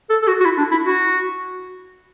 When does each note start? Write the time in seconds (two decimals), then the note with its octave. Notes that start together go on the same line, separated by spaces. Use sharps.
0.10 A4
0.22 A4
0.28 F#4
0.41 F#4
0.45 E4
0.58 D4
0.72 E4
0.84 F#4